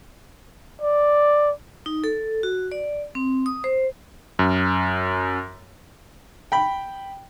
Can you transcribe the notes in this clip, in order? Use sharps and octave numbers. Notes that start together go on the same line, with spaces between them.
D5
D#4
A4
F#4
D5
C4
D#6
C5
F#2
G5 B5